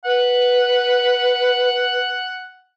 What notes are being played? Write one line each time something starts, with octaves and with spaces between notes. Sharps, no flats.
B4 F#5